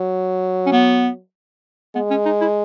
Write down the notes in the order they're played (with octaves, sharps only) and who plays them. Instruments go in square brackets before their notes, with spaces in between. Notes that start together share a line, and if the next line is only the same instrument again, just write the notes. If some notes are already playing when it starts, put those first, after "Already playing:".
Already playing: [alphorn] F#3
[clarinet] C#4
B3
[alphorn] G#3 [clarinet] B3
[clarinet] C#4
D#4
E4